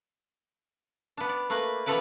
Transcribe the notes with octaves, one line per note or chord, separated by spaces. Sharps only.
B3 D4
D5
A3 A#3 B4
E3 F3 B3 A4 B4 D5